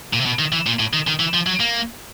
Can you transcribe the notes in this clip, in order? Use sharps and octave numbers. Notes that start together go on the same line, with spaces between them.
A#2
C3
B2
D#3
E3
A#2
A2
D#3
D#3
E3
F3
F#3
A#3